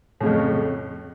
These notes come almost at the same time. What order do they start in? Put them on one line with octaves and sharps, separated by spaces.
A2 C#3 F2